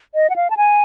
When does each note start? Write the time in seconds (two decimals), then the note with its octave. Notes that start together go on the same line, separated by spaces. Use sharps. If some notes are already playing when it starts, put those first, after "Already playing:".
0.15 D#5
0.30 F#5
0.36 F5
0.50 A5
0.57 G#5